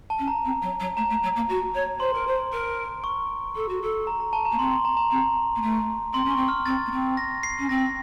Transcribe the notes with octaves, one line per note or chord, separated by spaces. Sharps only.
A5
C#4
A#5
C4
F#3
F#3
A3 A#5
A3
F#3
A#3
F#4
C#5
C5 C6
A#4
C5
A#4
C#6
A4
F#4
A4
A#5
A#5
A5
A#5
A#3
C4 C6
C6
A#5
A#5
C4 A#5
A#3
A3
C4 C6
C#4
C#6
C4
F6
C4 A6
A#3
C4
A#6
C7
C#4
C4 A#6